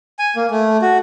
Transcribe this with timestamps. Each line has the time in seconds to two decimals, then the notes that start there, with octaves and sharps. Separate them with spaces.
0.19 G#5
0.36 A#3
0.51 A3
0.82 F#4